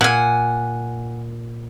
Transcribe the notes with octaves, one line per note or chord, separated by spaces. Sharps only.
A#2 F#5 G#5